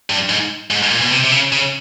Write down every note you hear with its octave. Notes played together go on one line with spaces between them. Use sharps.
G2
G#2
G#2
A#2
B2
C3
C3
C#3
C#3